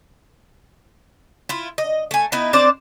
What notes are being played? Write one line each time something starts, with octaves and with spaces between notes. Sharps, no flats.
E4 F4
D#5
A3 G#5
B3 D#4 E4
C4 D4 C5 D5